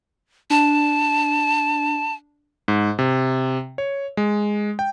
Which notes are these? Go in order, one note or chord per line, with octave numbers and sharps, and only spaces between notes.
D4 A5
G#2
C3
C#5
G#3
G5